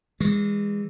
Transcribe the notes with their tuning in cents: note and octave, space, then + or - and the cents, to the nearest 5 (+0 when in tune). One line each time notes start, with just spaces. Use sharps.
E3 +0 G#3 -25